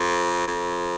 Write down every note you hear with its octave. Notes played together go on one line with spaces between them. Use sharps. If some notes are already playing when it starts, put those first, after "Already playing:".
Already playing: F2
F2